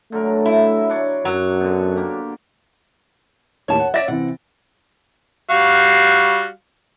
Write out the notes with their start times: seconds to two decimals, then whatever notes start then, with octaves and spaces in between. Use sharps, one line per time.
0.12 D3 F#3 A3 A#4
0.46 E4
0.89 D4 C#5
1.25 F#2 F#3
1.60 B2 D3
1.96 A#3 G4
3.68 D#2 A2 G4 C#5 A5
3.80 F#5
3.94 C#5 D5 E5 A6 A#6 D7
4.08 C3 E3 C4 F#5
5.50 G3 F#4 F5